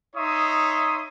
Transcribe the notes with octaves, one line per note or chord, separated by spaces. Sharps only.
D#4 C#5 E5 C6 D#6